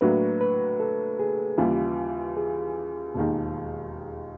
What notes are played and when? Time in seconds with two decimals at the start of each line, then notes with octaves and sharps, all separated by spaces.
0.01 A2 F#3 A#3 D4 F#4 B4
0.41 B4
0.80 A4
1.20 G#4
1.58 D#2 C#3 E3 G3 F4
2.37 G#4
3.15 E1 D#2 D#3